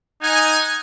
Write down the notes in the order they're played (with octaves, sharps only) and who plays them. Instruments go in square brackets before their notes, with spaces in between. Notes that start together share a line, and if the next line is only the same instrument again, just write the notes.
[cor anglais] D#4 [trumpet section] F#5 G#5